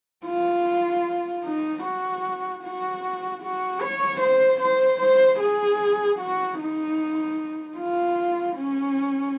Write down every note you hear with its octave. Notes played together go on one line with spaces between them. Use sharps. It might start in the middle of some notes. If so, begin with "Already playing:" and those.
F4
D#4
F#4
F#4
F#4
C#5
C5
C5
C5
G#4
F#4
D#4
F4
C#4